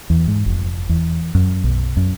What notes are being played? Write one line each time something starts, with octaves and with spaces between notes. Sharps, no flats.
E2
G#2
F1
E2
F#2
B1
F#2